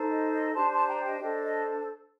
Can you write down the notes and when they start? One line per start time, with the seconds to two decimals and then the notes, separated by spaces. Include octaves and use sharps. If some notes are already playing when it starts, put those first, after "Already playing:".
Already playing: D#4 A4 C5
0.10 D#5
0.33 D#5
0.54 D4 G4 C5 A5 C6
0.71 A5 C6
0.88 G5 A#5
1.05 D#5 G5
1.21 D4 A4 C5 D#5
1.44 D#5